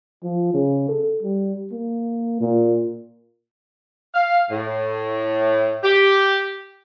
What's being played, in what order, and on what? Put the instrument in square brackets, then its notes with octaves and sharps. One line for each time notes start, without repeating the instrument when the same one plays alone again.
[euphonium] F3
C#3
A4
G3
A#3
A#2
[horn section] F5
A2
G4